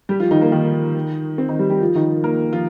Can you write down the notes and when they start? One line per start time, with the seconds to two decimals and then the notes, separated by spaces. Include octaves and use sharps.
0.09 G3 G4
0.20 F3 F4
0.31 D#3 D#4
0.41 A#3
0.52 D#3 D#4
1.38 C4
1.49 D#3 D#4
1.59 G3 G4
1.70 G3 G4
1.81 F3 F4
1.95 D#3 D#4
2.24 A#3 A#4
2.53 F3 F4